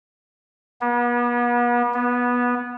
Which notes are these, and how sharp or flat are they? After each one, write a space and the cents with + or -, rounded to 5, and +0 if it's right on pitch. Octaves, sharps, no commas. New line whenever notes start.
B3 -40
B3 -15